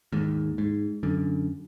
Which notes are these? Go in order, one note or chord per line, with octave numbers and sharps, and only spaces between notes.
D#2 G#2
G#2
F#2 D3